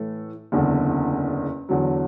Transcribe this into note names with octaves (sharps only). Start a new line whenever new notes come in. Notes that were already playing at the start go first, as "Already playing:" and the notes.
Already playing: A2 E3 A3
F#1 E2 D3
E2 D3 F#3